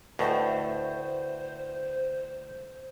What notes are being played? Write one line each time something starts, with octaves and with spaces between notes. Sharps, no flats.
D2 A2 B4 C5 D#5 E5